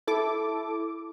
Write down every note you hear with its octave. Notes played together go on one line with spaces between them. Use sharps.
E4 A4 D6